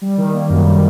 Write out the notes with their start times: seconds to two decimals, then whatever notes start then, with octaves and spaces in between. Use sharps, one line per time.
0.02 G3
0.17 D#3
0.34 A#3
0.50 F#2
0.65 G3